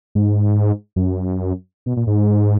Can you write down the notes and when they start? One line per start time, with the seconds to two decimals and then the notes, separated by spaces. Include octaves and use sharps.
0.15 G#2
0.96 F#2
1.86 B2
1.97 A#2
2.07 G#2